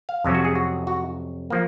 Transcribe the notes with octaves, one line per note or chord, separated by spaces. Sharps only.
F5
F2 C3 F#3 C#4
F#4
G#4
F#4
F#4
F3 A#3